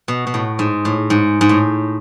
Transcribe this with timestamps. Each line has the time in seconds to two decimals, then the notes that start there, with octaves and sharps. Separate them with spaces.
0.08 B2
0.27 B2
0.34 A2
0.59 G#2
0.85 A2
1.10 G#2
1.41 G#2
1.49 A2